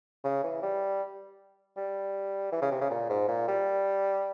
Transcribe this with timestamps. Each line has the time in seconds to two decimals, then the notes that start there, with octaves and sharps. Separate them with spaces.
0.24 C#3
0.44 E3
0.63 G3
1.77 G3
2.52 E3
2.62 C#3
2.71 C3
2.81 C#3
2.90 A#2
3.10 G#2
3.28 A#2
3.48 G3